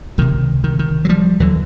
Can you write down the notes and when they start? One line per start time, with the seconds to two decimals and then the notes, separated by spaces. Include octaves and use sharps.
0.18 C#2 C3 D#3
0.64 D#3
0.79 D#3
1.05 F#3
1.09 F3 G3
1.40 D#2 D3 E3 F#3